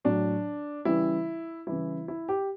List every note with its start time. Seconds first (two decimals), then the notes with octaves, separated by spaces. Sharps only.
0.05 A2 F#3 D4
0.85 C#3 E3 G3 E4
1.67 C#3 E3 G3 E4
2.08 E4
2.29 G4